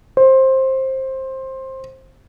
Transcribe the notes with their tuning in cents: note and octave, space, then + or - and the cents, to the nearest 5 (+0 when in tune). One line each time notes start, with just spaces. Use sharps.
C5 +15